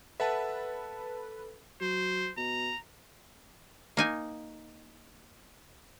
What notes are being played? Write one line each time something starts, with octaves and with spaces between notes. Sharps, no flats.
A4 B4 E5 F#5 A5 A6
F#3 C5
B2 A#5
A#3 D#4 G#5